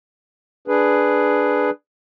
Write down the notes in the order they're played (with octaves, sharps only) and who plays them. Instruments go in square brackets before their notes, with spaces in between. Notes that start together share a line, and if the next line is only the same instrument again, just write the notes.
[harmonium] D4 G#4 B4